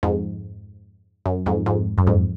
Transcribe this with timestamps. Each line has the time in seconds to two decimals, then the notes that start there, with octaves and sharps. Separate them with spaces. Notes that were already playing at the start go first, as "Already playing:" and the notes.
0.03 F2 G#2
1.26 F#2
1.46 F2 G#2
1.66 F2 G#2
1.98 F#2
2.07 F2 G#2